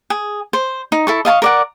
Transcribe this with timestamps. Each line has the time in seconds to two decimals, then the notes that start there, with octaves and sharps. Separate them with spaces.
0.10 G#4
0.53 C5
0.92 D#4
1.07 E4 A4 C#6
1.25 D#5 F5 A5 C#6
1.42 A#4 D5 F#5